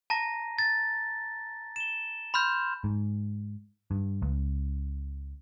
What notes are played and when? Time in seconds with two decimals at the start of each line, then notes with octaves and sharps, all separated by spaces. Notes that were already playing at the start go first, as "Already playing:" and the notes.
0.10 A5 A#5 A#6
0.59 A6
1.76 E7 G7
2.34 B5 C6 F6 G6
2.84 G#2
3.91 G2
4.22 C#2